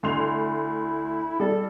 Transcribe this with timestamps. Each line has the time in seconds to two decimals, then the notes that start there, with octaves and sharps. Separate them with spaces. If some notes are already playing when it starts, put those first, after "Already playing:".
0.03 D2 E4 C6 F7
1.40 G3 A4